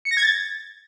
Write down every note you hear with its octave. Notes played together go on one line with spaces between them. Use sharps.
C#7
A#6
G#6
A6